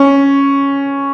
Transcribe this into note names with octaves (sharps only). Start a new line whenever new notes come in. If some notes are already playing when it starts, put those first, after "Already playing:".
Already playing: C#4